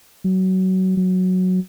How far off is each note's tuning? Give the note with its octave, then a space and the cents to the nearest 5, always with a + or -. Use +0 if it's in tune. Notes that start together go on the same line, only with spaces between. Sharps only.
F#3 +20
F#3 -5